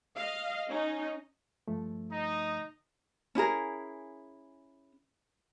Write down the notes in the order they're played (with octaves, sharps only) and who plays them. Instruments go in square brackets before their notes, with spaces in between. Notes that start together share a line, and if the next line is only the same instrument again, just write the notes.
[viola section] D#5 F5
C#4 D#4
[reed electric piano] G2 F3 A3
[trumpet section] D#4 D#5
[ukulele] C#4 E4 G#4 A#4